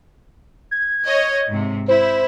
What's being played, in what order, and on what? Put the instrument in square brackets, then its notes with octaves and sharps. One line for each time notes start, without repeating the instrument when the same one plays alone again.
[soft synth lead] G#6
[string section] C#5 D#5
G#2 C3
[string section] E4 [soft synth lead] C5